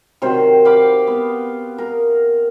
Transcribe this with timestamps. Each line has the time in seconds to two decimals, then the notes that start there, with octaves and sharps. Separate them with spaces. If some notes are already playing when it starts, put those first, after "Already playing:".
0.22 C3 D#3 F#3 C5
0.65 F5 G5 B5 D6
1.07 B3
1.78 A#4